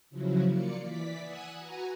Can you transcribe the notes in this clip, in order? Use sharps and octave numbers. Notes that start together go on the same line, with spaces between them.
C#3 F3 F#3 E4 F#4
A#3 F4 D5 C#7
E3 D5 B6
F#5 G#5 D#6 E6 F#6 G#6
F#4 B4 F#5 G#5 A#5